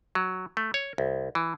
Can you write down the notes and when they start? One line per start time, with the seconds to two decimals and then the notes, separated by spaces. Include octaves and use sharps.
0.15 F#3
0.57 A3
0.74 C#5
0.98 C2
1.35 E3